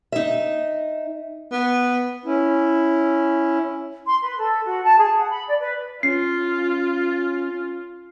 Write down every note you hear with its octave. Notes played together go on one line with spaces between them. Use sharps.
D#4 E5
B3
C#4 E4
C6
B4
A4
F#4
A5
G#4
F#5
B5
D5
B4
C#4 F4 C7